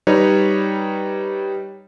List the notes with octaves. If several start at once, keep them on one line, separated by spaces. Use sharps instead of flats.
G3 D#4 B4 C#5